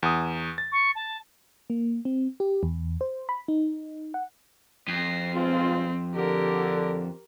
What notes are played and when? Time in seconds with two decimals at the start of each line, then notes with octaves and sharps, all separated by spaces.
0.03 E2 D#6
0.58 A6
0.72 C#6
0.95 A5
1.70 A#3
2.05 C4
2.40 G4
2.63 E2
3.01 C5
3.29 B5
3.48 D#4
4.14 F#5
4.88 F2 A#6 C7
5.34 B1 G#3 C4 F4
6.14 D3 G4 A#4